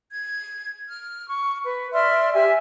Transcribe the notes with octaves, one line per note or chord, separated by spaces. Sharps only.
G#6
F6
C#6
B4
D5 E5 C6 F6
G4 E5 G#5